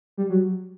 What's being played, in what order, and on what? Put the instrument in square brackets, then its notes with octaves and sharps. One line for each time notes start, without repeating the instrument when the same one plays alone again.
[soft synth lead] G3
F#3